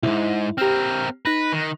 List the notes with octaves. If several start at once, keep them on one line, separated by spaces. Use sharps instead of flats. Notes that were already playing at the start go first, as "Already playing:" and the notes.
B1 G#2 E4
C4 G4 A#4 F6
D#4 B4 F#6 A#6
D#3